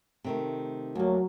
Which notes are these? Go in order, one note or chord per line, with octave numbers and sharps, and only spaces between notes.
C3 D#3 A3
D2 F#3 A#3